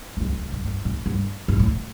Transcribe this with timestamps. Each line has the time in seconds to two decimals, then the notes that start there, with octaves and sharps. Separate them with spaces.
0.17 G3
0.21 F3
0.32 D3
0.42 C3
0.52 G2
0.64 G2
0.85 A2
1.06 G2
1.48 G2
1.59 A2